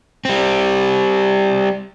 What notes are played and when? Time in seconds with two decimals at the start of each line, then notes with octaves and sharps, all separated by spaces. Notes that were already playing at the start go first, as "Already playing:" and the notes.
0.25 G3 C4